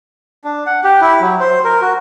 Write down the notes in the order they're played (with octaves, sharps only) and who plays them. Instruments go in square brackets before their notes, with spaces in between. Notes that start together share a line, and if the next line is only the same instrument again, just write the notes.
[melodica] D4
F#5
G4
E4
F#3
C5
A#4
F#4